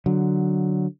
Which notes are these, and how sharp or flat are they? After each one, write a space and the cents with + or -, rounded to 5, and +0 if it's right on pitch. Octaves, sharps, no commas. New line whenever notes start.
D3 +0 F#3 +0